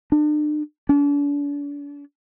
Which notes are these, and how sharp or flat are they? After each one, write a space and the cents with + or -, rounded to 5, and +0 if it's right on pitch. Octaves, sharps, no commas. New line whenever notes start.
D4 +40
D4 -40